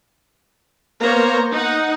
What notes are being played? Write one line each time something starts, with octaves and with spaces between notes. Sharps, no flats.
A#3 B3 C5 C#5 A#5
D#4 F#5